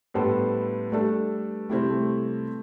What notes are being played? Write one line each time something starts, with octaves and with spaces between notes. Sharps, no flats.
A2 G3 B3 D4 A4 C5
G3 A3 D4 A4
C3 G3 A3 C4 E4 G4
A3